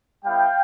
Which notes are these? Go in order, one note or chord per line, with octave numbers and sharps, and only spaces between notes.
G3 B3 E4 F5 G5